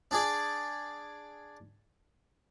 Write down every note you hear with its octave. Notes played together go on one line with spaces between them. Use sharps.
D4 G#4 D5